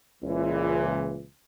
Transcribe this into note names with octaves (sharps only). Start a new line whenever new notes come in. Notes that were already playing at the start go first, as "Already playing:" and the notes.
C#2 A#2 E3